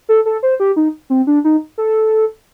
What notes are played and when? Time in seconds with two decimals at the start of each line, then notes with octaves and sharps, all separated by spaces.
0.09 A4
0.26 A4
0.43 C5
0.60 G4
0.76 D#4
1.10 C4
1.27 D4
1.44 D#4
1.78 A4